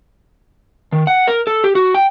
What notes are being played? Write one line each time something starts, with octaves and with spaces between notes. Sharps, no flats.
D#3
F#5
A#4
A4
G4
F#4
G5